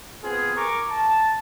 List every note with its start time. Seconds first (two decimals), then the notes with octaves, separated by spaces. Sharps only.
0.23 B3 C4 F4 G#4
0.56 A#4 A#5 C#6 D6
0.90 A5